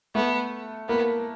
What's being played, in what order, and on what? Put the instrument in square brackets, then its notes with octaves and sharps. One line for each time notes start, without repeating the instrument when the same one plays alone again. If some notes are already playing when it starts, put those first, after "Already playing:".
[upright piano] A3 [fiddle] B3
[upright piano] A#3 [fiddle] B3